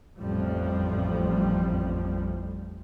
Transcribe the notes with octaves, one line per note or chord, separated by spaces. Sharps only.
A1 F2 A2 F3 G3